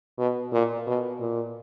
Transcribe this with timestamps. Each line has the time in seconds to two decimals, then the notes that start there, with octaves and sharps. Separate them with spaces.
0.18 B2
0.53 A#2
0.87 B2
1.20 A#2